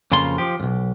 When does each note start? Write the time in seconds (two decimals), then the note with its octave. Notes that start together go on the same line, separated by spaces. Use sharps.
0.12 F2 C#3 A#3 F4 C6
0.38 F3 G4
0.60 B1 F2